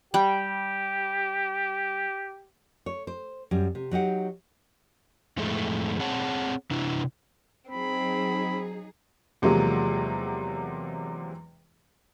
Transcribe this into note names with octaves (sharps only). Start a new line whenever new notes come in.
G3 G4 G5
C#5
C5
F#2 G3
C3
F#3 D#4 G4 F#5
F2 A2 G#3 A3
C4 G#4 C#5 F#5 A5
C3 D4 E4
F#3 C4 D#4 G#4 B5
E2 C3 F3 F#3 G#3 A#3